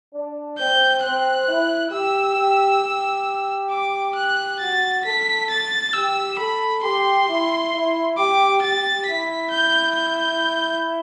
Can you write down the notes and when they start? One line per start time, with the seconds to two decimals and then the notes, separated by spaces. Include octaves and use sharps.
0.14 D4
0.58 C4 G6
1.04 C4 F#6
1.48 E4
1.92 G4 E6
2.37 G4
2.81 G4
3.70 D6
4.15 F#6
4.59 F#4 A6
5.04 A4 B6
5.50 A6
5.93 G4 E6
6.38 A4 B5
6.82 G4 C6
7.27 E4
7.73 E4
8.17 G4 D6
8.61 G4 A6
9.06 E4 B6
9.50 G6
9.95 G6